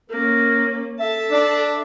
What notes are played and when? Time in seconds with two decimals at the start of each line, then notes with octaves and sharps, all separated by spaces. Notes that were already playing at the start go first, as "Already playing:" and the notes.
0.10 A#3 C#4 A#4
1.00 A4 E5 A5
1.31 D4